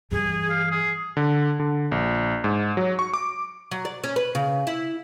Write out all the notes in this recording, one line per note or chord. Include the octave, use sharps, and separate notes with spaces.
G2 E3 G#4
F5
G#4
D3
D3
A#1
G#2
F#3
C#6
D6
F#3
D5
C#4
B4
C#3
E4